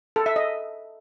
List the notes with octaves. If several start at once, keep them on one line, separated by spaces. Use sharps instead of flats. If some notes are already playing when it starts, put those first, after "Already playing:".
A4
E5
D#5